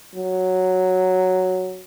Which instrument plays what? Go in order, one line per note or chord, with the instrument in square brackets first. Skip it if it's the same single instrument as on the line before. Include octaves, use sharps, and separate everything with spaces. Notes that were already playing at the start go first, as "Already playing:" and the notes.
[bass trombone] F#3